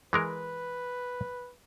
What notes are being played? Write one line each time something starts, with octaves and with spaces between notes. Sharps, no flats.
E3 G#3 A#4 B4